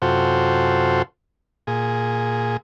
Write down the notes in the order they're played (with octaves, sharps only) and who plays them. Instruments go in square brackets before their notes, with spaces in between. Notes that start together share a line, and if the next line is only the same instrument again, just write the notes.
[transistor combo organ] F#2 C3 F4 F#4 A4 C5
A#2 G#4